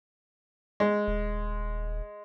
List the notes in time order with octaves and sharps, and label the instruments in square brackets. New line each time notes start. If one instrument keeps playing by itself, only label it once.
[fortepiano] G#3
[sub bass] D#1